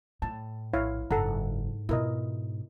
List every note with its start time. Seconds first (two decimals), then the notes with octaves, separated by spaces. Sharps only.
0.22 A2 A5
0.73 A#1 E4 C#5 F5
1.11 F#1 G#2 A4 F#5 A#5
1.89 B2 E4 F4 A#4 D#5